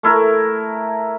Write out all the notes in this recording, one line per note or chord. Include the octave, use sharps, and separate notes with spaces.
A3 E4 A#4